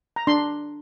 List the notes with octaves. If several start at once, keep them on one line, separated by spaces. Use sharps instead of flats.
A#5
D4 C6